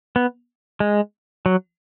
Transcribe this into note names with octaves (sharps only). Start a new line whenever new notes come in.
B3
G#3
F#3